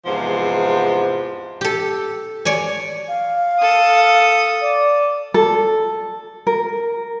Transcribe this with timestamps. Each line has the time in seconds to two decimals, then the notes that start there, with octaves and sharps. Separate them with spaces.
0.05 E2 G#2 C3 F3
1.61 G4 A4
2.45 C#5 D5 G#5
3.08 F5
3.60 A4 D#6
4.61 D5
5.34 A4
6.47 A#4